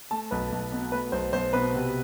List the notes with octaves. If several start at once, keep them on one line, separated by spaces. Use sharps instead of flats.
A3 A5
B1 B4
B1
B2
A3 B4
B1 C5
B1 C5
B2 B4
C3